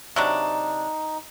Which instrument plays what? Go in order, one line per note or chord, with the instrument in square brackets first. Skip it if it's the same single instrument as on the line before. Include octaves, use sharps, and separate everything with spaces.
[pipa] C3 F#3 D4 [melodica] D#4